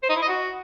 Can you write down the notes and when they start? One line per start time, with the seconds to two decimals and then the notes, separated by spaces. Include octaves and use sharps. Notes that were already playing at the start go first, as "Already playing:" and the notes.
0.03 C5
0.09 D#4
0.16 E4
0.22 D#5
0.28 F#4